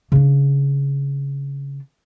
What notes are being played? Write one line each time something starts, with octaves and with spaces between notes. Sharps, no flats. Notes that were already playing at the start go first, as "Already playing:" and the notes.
C#3 D4